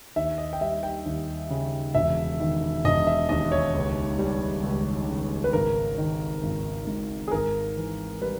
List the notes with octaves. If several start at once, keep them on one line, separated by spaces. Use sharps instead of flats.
D#2 E5
D#5
G5
G3 E5
G5
D#2
C#3
E1 E5
D#3
E1 D#5
E5
D#2 D#5
C#5
C#2
G3
C#2
C#3
B4
G#1 A#4
D#3
G#1
G#2
G#4
G#1 A#4
E3
G3 B4